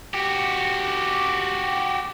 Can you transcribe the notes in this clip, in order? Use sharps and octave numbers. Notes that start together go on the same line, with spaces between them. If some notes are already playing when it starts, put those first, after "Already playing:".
F#4 G4